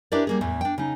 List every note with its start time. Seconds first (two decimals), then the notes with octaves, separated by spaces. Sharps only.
0.12 D4 E4 G4 A#4 B4 D5
0.27 G3 A#3 G#4
0.41 E2 A2 E3
0.61 D4 G5
0.78 C#3 D#4